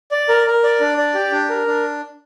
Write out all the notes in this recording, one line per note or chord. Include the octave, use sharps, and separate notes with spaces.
D5
A#4
A#4
D5
D4
D5
G4
D4
A#4
D4